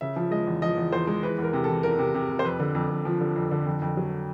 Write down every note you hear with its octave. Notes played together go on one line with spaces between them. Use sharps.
C#3 E5
F3
G#3 D#5
E2
F3 D#5
E2
E2 C5
G#3
E3 B4
E2 A#4
C3
E3 A4
E2 A#4
C3
C3
C3
C5
F2 B4
D3
F2
F2
F3
D3
F2
D3
F2
F2
F#3